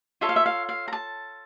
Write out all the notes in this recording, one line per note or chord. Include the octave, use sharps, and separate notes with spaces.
F4 A4 C#5 E5
F5
E5
F5
F5
A#5
A5